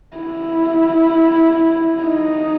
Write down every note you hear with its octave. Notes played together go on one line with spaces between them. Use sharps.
E4
D#4